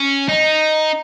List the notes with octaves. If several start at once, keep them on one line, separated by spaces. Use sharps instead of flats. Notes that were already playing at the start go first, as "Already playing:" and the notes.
Already playing: C#4
D#4